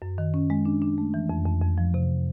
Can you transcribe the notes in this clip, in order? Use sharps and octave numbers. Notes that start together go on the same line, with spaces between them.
F#2
D#3
C#4
G#3
D4
D4
A3
E3
F2
F2
F2
F3
C3